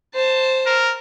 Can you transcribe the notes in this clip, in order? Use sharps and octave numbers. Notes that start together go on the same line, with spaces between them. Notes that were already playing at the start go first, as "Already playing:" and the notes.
C5 A5
A#4